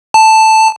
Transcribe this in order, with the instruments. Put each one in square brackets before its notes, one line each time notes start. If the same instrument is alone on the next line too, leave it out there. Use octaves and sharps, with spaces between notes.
[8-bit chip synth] A5